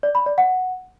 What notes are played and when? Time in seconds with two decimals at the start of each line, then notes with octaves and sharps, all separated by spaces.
0.03 D5
0.15 B5
0.26 D5
0.38 F#5